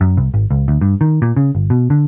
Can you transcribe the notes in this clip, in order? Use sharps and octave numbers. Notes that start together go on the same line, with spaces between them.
F#2
C2
G#1
C#2
D2
G2
D#3
A#2
C#3
G1
B2
D3